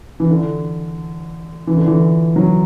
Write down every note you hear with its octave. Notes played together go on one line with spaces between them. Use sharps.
E3
D3
E3
D3
E3
F#3